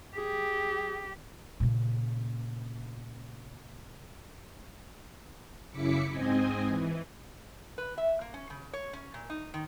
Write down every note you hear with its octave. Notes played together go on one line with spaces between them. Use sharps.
G4 G#4
A#2 C#3
F#2 C#3 E4 D6 B6 C#7
G#2 C4 D#5 G#5
E3
B4
E5
A#3
C#4
C#3
C#5
C#4
A#2
D#4
D#3